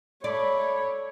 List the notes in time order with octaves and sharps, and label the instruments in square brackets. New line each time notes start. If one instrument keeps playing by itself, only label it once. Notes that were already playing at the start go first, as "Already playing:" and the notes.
[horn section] A3 B5 [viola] C#5 [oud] D5